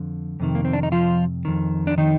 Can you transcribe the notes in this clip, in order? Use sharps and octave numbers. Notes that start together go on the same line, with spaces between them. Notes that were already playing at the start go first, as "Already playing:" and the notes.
Already playing: F2 D3
F2 C3 D#3
A#3
C4
D4
D#4
F3 F4
F2 D#3
D4
D#3 D#4